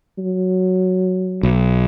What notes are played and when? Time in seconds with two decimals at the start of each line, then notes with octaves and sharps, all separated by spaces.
0.18 F#3
1.43 B1